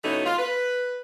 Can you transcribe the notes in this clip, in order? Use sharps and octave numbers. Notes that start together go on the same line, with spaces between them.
B2 E3 A3 B3 C#4 D#4
F4
B4